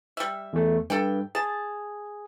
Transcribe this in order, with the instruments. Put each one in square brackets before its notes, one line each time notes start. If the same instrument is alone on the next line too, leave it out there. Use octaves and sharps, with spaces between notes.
[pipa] G3 E5
[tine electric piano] E2 A3
[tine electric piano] G2 [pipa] A4 G5
[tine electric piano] G#4 [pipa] A5